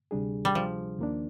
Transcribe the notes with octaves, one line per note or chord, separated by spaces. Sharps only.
D2 C3 G3 D4 G#4
G3
F3
D#2 D#3 A#3 D4